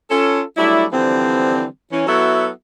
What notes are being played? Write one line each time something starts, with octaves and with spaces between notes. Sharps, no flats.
C#4 F4 A4
F#3 G3 A3 D4 E4
D3 E3 F3 G3 C4
E3 C#4
F#3 B3 E4 F#4 A4 E5